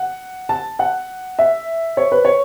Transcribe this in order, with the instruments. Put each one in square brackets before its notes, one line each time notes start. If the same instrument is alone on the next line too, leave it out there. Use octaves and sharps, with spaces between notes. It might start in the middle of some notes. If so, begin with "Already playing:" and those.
Already playing: [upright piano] F#5
A5
F#5
E5
C#5
B4
C#5